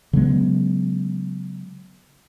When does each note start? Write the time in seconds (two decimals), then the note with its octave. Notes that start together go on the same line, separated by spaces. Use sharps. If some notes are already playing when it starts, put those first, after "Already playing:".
0.13 C#3 F#3 G#3 B3